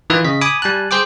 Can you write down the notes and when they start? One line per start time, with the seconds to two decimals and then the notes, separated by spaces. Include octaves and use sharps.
0.10 D#3 E3 F4 B4
0.25 C#3 D#5 B6
0.41 G#5 B5 D6 D#6
0.62 G3 G#5 A5 F#6
0.91 G#4 C5 G5 D6